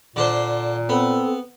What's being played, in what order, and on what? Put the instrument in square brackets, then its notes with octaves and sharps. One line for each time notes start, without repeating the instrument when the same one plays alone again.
[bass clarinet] A#2 [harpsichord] D3 D4 C5
[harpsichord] B3 [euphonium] C4 [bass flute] A4